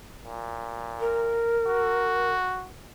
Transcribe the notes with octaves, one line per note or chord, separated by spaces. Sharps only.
A#2
A#4
F#4